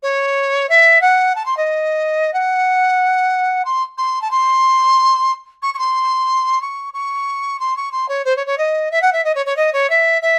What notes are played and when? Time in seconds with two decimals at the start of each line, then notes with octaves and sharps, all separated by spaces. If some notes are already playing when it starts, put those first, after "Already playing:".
0.02 C#5
0.69 E5
1.01 F#5
1.35 A5
1.45 C6
1.57 D#5
2.33 F#5
3.65 C6
3.97 C6
4.22 A5
4.31 C6
5.62 C#6
5.74 C#6
5.78 C6
6.61 C#6
6.93 C#6
7.59 C6
7.76 C#6
7.92 C6
8.08 C#5
8.25 C5
8.36 C#5
8.46 C#5
8.58 D#5
8.91 E5
9.02 F#5
9.13 E5
9.24 D#5
9.35 C#5
9.46 C#5
9.56 D#5
9.73 C#5
9.89 E5
10.22 E5